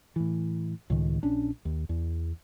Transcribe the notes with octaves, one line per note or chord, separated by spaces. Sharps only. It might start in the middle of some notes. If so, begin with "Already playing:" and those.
A2 E3
C#2 A2 D#3
A#1 C#4 D4
D#2
E2